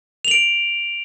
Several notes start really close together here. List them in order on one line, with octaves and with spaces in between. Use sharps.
F7 F#7 D7